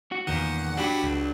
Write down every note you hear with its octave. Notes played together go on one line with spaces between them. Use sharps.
F#4
E2 A#2 D#3 F#5
F#3 D4 F#4 G4 B5
C#2